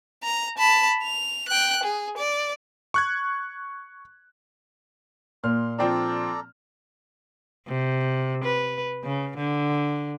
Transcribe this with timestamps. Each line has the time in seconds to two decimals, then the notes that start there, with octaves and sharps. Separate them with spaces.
0.23 A#5
0.58 A5 B5
1.03 F7
1.49 G5 F#6
1.84 G#4
2.18 D5
2.94 C#6 F#6 G#6
5.44 A#2 C6 F6
5.79 F3 C4 D4 A4 D5 A#5
7.67 C3
8.44 B4
9.04 C#3
9.37 D3